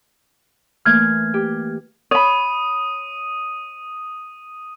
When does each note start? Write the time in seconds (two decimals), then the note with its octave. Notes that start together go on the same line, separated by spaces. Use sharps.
0.85 E3 A3 A#3 F6 G#6
1.34 G4
2.11 C#5 B5 D#6 D#7